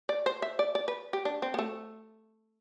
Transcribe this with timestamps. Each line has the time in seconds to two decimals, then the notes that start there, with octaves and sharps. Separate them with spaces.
0.09 D5
0.26 C5
0.42 E5
0.59 D5
0.75 D5
0.88 B4
1.13 G4
1.25 D4
1.42 C4
1.54 B3
1.59 A3